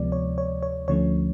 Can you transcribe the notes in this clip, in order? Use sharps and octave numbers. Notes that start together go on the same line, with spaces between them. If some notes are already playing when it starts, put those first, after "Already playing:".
Already playing: D2 C3 F3 G#3 B3 D5
C#5
C#5
C#5
D2 D3 F3 A3 C#4 C#5